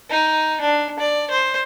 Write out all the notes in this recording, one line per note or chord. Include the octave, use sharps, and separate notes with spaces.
D#4
D4
D5
C5